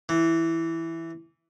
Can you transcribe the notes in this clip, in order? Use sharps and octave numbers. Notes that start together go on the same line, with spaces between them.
E3